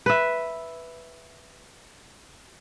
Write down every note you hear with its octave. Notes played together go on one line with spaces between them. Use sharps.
B4 E5